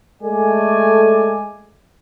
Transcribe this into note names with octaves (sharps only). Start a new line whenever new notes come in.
G#3 A3 A4 D5 G#5